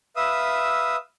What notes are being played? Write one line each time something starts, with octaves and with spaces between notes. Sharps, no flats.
B4 E5 F5 D#6 E6